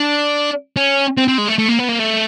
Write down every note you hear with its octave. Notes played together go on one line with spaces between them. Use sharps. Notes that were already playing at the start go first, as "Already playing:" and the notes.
Already playing: D4
C#4
C4
C4
G#3
A3
A3
A#3
B3
A#3
A3